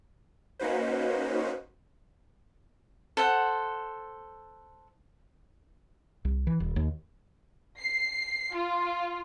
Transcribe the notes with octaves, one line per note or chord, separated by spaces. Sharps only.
A#3 C#4 D#4 F#4 B4 C5
A4 C5 F#5
C2
E3
D#1
D#2
C7
F4